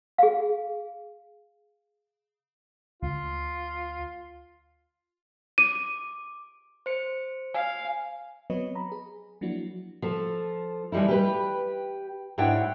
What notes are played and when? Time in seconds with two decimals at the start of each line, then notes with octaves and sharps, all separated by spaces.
0.18 G#4 F5
3.02 D2 F4
5.58 D6 D#7
6.86 C5 C#7
7.54 F5 G#5
8.50 F#3 B3 C4 B4 C#5 D#5
8.75 A#5 B5
8.92 G#4
9.41 F3 F#3 A#3 D4 E4 F#4
10.02 F3 A4
10.92 E3 F3 G3 D#4 E4
11.08 G4 B4
12.38 G#2 D4 E4 C#5 F#5 G5